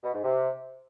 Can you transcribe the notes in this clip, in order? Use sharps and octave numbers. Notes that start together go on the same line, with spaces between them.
B2
G#2
C3